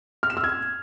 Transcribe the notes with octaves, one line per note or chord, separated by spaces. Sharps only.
F6
E7
E6
G#6